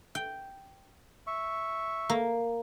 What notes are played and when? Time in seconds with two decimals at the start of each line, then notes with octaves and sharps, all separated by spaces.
0.15 G5
1.27 E5 C#6
2.09 A#3